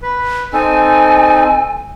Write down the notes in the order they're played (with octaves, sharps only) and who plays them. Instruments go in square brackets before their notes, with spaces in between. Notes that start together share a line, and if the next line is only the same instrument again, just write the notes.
[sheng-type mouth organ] B4
[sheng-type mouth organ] C4 D#4 A4 [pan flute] G#5